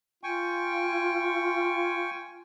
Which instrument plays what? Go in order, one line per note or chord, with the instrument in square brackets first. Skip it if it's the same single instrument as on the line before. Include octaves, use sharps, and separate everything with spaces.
[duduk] F4 [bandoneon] G5 G#5 C#6